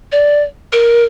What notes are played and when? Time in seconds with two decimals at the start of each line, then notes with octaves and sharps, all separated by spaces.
0.12 D5
0.72 A#4